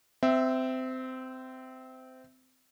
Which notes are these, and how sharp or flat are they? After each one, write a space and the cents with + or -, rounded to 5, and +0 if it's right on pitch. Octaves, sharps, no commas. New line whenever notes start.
C4 -20 E5 +0